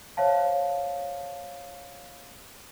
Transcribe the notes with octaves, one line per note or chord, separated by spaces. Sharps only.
C5 C#5 E5 F5 A5